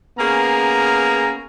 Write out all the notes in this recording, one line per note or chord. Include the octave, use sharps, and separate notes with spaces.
A#3 B3 C#4 G#4 A#5